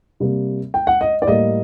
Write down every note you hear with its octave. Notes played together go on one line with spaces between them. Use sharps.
C3 G3 A#3
G5
F#5
D#5
D5
A2 G3 A#3 D#5